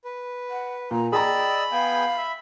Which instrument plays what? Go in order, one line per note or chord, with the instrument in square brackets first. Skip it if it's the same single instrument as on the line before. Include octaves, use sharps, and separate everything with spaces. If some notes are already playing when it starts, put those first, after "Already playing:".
[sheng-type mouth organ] B4
[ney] F#5
[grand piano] A#2 [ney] A#5
[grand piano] G#4 A#5 [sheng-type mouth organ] D5 D#5 E6 [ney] G5 [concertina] B5
[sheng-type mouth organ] B3 G5 G#5 [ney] F5
[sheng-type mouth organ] E5